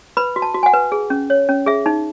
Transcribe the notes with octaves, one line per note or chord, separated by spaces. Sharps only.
B4 B5
F#4
A5
F#4
G#5
F#5
B4
G#4
C#4
C#5
C#4
G#4 E5
D#4